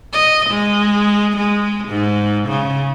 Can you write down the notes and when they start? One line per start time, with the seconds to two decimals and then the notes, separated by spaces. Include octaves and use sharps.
0.13 D#5
0.50 G#3
1.36 G#3
1.88 G#2
2.48 C#3